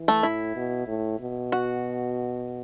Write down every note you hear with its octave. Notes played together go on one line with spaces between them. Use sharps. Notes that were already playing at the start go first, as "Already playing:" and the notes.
Already playing: E3
A3
A2 E4
B2
A2
B2
F#4